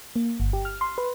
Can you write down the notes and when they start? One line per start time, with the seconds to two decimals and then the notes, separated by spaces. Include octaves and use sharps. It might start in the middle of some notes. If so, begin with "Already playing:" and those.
0.16 A#3
0.40 G1
0.53 G4
0.65 F6
0.81 C6
0.98 B4